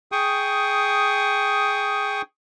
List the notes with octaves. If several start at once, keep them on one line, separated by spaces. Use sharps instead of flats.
G#4 G5 C#6 D#6